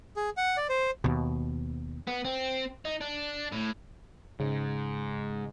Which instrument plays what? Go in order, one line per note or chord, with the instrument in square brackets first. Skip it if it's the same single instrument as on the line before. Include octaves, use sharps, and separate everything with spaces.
[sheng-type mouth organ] G#4
F#5
D5
C5
[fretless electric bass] D#2 B2
[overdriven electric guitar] B3
C4
D#4
D4
A2
[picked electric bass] G#2 [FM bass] C#3